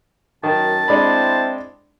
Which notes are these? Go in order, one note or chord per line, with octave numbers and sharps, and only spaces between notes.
F#2 D#3 A5
G#3 C4 D4 E4 B5